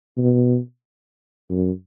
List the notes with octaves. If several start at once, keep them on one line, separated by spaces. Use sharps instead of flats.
B2
F#2